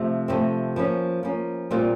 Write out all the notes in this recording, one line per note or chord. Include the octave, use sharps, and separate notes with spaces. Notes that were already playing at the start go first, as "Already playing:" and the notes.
Already playing: C3 F3 A3
C3 F3 A3 C4
F3 A#3 C#4
F3 A#3 C#4
A#2 G3 C4 F4